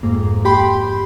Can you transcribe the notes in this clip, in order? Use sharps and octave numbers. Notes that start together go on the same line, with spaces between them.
F2 G#2 A#3
G4 G5 B5 C6